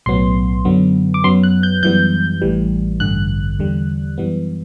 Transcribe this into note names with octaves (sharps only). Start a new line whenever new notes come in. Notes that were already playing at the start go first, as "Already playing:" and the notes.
B1 A2 F#3 B3 C6
F#2 D3 F#3 B3
D6
F#2 F#3 B3 C6
F#6
G6
F#2 E3 G3 B3 G6
A1 A2 E3 G3
A1 G2 D3 F#6
E2 D3 G3
F#2 E3 G3 B3